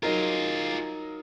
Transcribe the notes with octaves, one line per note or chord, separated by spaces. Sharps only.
F#3 D#4 F4 G#4 A#4